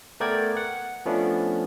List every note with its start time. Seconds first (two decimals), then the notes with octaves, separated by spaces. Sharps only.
0.20 A3 B3 A#4 D5 G5 G#6
0.57 F#5
1.05 F3 A3 B3 C#4 D4